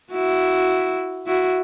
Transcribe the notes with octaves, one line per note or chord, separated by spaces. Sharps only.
E4 F#4
E4 F#4